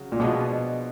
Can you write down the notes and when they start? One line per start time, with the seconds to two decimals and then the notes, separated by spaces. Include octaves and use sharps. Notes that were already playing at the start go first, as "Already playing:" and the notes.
Already playing: C#3 F#3
0.12 A#2
0.20 B2 F3 G#3 B3 D4